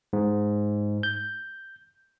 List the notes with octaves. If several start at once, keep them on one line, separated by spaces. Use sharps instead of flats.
G#2
G6